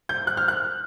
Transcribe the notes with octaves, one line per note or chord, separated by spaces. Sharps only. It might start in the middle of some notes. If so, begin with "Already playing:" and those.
G6
F#6
F6
F#6